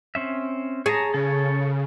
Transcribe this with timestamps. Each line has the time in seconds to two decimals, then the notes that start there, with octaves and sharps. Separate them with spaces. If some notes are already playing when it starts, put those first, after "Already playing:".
0.15 C4 C#4 E5
0.86 G#4 C#5 A5 A#5
1.14 C#3 A4 C#5